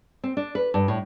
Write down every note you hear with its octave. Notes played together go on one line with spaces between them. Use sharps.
C4
D4
B4
G2
A2